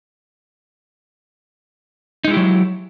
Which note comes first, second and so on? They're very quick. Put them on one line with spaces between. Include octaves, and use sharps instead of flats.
D#4 G#3 E4 G4 F#3